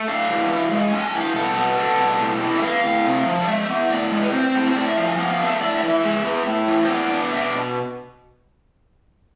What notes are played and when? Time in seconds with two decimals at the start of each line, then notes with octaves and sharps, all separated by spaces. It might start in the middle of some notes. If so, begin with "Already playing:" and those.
Already playing: A3
0.08 D4 F5
0.29 E3
0.49 E3
0.72 G#3
0.93 D4 G#5
1.06 G#5
1.15 E3
1.21 F5
1.36 B2 A4
1.57 B3
1.77 D4 A4
2.00 B2
2.20 A2
2.41 E3
2.58 E5
2.62 B3 F5
2.84 A2
3.05 C3
3.26 F3
3.41 D5
3.48 G#3 E5
3.69 B3
3.90 A2 D5
4.11 G#3
4.23 B4
4.33 C4 C5
4.54 A2
4.71 C5
4.75 A2 D5
4.87 E5
4.97 F3 F5
5.08 G#5
5.18 B3 F5
5.33 F5
5.39 D4
5.47 E5
5.60 A2 D5
5.75 E5
5.83 E3
5.90 E5
6.04 G#3
6.25 B3
6.46 A2
6.68 E3
6.85 C5
6.88 B3 D5
7.11 D4
7.31 B2 E5
7.41 D5